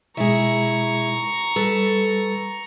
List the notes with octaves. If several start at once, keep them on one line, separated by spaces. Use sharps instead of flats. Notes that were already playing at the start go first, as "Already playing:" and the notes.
B2 G#3 E4 G#4 A#5 C#6
G3 A4 B4